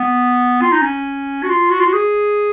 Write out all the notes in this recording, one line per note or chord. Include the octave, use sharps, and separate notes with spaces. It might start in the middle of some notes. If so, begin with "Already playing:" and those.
Already playing: B3
F4
D#4
C#4
F#4
F4
F#4
F4
F#4
G#4